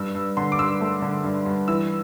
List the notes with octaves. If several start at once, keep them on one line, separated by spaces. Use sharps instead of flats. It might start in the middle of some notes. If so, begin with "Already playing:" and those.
Already playing: G2 E6
G2
D3 C6
D6
G2 E6
A3
D3
G2
G2
E3 E6